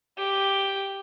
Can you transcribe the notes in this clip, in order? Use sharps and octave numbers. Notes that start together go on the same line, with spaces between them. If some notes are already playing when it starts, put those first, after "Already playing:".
G4